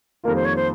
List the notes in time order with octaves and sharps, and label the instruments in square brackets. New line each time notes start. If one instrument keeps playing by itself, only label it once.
[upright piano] F2 D#3 G3 A#3 F4 [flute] A#4
[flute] C5
C#5
C5